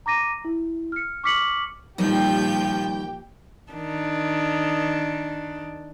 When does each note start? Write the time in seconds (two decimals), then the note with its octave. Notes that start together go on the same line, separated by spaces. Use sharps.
0.06 A#5 D6 A#6 D#7
0.45 E4
0.92 F6 C#7
1.24 C#6 D6 F6 B6 C#7 F#7
1.98 A#2 D#3 F3 G3 G4 G5 G6
3.72 D#3 D4